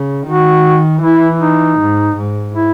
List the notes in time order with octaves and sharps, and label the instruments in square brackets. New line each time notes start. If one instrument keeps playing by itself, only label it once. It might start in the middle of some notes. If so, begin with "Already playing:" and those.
Already playing: [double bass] C#3
[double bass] D#3 [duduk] F#4
[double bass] E3 [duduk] E4
[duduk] D#4
[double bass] G#2
G#2
[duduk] E4